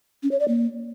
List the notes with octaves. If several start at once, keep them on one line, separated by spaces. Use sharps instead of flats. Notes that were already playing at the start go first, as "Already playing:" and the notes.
C#4
C#5
D5
A#3